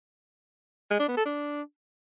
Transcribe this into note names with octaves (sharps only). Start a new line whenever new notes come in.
G#3
D4
B3
A4
D4